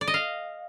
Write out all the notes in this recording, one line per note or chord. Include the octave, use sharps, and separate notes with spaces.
D5
D#5
F5